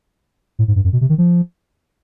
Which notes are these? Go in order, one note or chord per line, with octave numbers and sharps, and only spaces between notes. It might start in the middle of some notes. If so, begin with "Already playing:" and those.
A2
G#2
G2
F#2
B2
C3
D#3
F3